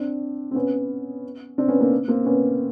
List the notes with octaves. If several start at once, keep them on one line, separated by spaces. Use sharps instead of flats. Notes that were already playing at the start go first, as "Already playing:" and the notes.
Already playing: C4 D4
C4
B3 C#4
C4 D4
B3 C#4
A#3 C4
A#3 C4
B3 C#4